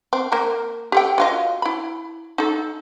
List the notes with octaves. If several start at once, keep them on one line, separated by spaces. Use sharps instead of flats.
C4
A#3 A#4
G4 A4 G5
F#3 F4 D#5
E4 B5
D#4 A4